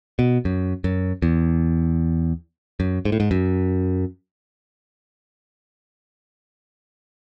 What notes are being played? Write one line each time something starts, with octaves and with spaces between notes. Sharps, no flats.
B2
F#2
F#2
E2
F#2
G#2
A2
G#2
F#2